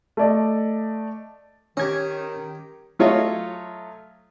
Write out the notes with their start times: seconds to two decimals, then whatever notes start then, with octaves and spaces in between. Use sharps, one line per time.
0.17 A3 D5 D#5
1.77 D#3 C#4 D#4 G4 G#6
2.99 F#3 A3 F4 C#5 D#5